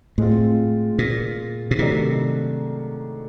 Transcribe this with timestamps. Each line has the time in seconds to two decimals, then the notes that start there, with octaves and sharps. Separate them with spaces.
0.18 A2 G#3 C4 F4
0.99 A#2
1.71 B2
1.79 G#2 C3 D#3 F#3 A3 D4